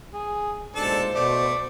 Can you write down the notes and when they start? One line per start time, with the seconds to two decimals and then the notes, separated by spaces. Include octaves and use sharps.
0.14 G#4
0.76 B1 A#2 G#3 D4 A4 C5 A5
1.15 B2 A3 D5